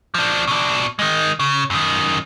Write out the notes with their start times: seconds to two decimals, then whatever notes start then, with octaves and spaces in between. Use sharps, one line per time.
0.14 F3 D4
0.47 B2 D4
0.99 D#3 G#3
1.40 C#3
1.70 F#2 D#3